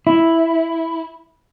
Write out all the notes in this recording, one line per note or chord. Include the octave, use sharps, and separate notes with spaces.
E4